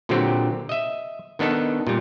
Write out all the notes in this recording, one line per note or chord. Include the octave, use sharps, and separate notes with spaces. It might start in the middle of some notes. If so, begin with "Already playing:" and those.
A#2 D3 F#3 C4 G4
D#5 E5
D#3 B3 D4 D#4 A4
A#2 G3